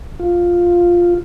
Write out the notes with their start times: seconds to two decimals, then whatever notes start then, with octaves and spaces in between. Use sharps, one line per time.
0.19 F4